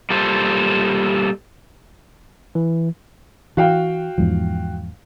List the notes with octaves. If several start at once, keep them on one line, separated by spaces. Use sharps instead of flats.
G3 A#3 F4 A4 C5
E3
E3 F#4 F5 G5
E2 G#2 F3